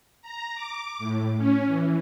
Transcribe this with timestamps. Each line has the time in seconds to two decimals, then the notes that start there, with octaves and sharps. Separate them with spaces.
0.22 A#5
0.55 D6
0.99 A2
1.37 C#4
1.67 E3